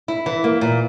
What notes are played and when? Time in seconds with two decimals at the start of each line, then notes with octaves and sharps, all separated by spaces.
0.08 E4
0.26 E3
0.44 A#3
0.61 A#2